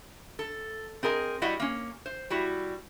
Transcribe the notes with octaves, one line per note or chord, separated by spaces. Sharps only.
A4
C4 G#4 A#4 D#5
G3 E4 F#4 D#5 F#5
A#3 C#4
C5
G3 E4 F#4